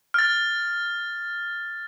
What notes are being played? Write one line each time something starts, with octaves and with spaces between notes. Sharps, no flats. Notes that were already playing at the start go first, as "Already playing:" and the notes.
F6 A6